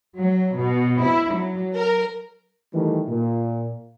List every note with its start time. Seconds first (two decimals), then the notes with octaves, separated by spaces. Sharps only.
0.19 F#3
0.58 B2
1.04 E4
1.35 F#3
1.75 A#4
2.74 D#3 E3 G3 A3
3.09 A#2